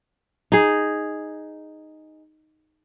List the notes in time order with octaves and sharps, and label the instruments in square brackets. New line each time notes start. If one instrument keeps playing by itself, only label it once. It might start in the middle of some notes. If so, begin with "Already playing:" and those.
[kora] D#4 G#4